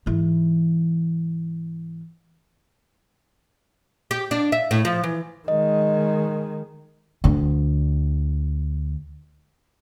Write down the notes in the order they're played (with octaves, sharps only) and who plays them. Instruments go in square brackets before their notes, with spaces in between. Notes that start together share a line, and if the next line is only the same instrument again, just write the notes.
[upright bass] G#2 E3
[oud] G4
D4
E5
A2
F3
E3
[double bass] D#3 G#3 [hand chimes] D#5
[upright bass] D2 D3